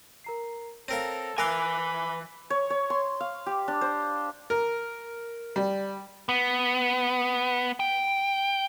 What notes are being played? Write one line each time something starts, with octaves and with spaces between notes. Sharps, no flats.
A#4 A#5 C7
C4 A4 A#4 C#5 F5 A#5
E3 A#4 F5 G#5 B5 D6 E6 F#6
C#5
C#5
C6
F5
G4
D4
C5
A#4
G3
B3
G5